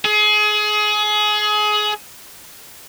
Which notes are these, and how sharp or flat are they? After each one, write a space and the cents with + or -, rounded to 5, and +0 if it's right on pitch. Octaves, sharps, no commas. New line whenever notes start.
G#4 +25